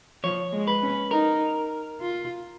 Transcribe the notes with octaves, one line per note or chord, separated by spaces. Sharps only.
F3 C#5
G#3
B4
C#4
D#4 A#4
F4